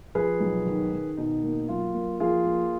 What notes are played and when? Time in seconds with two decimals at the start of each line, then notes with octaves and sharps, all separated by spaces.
0.15 F3 G#4 B4
0.40 B1
0.67 D#3
0.92 D#3
1.17 B2 D#4
1.43 A#3
1.68 F#3 F4
1.94 A#3
2.20 F3 F4 G#4
2.46 A#3